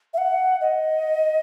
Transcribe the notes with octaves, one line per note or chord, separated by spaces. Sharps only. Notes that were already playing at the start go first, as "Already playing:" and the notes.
E5
F#5
D#5